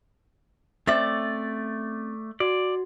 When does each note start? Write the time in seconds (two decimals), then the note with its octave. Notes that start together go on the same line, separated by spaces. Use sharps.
0.87 A3 C4 C#4 D5 E5 A6
2.40 F#4 D5